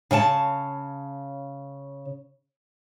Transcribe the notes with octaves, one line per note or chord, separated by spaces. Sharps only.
C#3 C#5 G5 A5